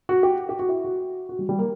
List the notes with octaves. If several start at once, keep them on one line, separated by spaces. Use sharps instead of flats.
F#4
G4
G4
F#4
E4
F#4
F#4
G3
G3
A#3